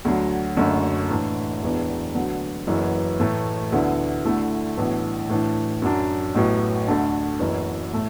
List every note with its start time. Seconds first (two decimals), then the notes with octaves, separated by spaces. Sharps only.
0.05 D2 D3 F#3
0.57 F#1 F#2 D3 A3
1.10 A2 E3 D4
1.62 E1 E2 E3 B3 D4
2.15 D2 D3 F#3 B3
2.67 F#1 F#2 E3 B3
3.20 A2 E3 A3
3.72 D2 D3 B3 E4
4.25 D2 D3 A3 E4
4.77 B1 A2 E3 B3 D4
5.29 A2 E3 D4
5.82 F#2 F#3 D4
6.35 A1 A2 F#3 B3
6.87 D2 D3 A3 D4
7.40 F#1 F#2 E3 B3
7.93 A2 A3